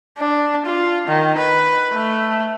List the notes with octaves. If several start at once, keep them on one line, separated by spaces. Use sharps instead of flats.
D4
F4
D#3
B4
A3